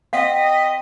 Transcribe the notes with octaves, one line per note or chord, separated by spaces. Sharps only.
C4 D#5 F5 F#5 B6